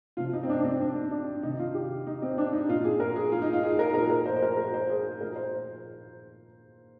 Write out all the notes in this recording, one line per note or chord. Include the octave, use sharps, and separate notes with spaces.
C3 F3 F4
D#4
C4
D4
D4
C4
D4
D4
D4
C3 D#3 D#4
F4
G4
D#4
C4
D4
D#4
A#2 F3 F4
G#4
A#4
G#4
F4
D#4
F4
G#4
A#4
A#2 F3 A#4
A#4
C5
C5
A#4
A#4
C5
G#4
A#2 F3 A#4
C5